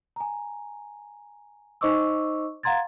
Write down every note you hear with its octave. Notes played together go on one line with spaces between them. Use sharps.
G#5 A#5
D#4 C5 D#5 C#6 D6 E6
F5 F#5 A#5 C6 G#6 A6